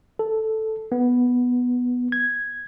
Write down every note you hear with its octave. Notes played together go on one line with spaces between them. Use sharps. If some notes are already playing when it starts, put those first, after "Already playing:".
A4
B3
G#6